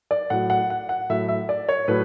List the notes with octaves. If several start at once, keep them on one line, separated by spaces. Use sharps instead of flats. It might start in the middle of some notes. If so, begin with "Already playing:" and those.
D5
A2 F#3 F#5
F#5
F#5
F#5
A2 F#3 E5
E5
D5
C#5
A2 F#3 B4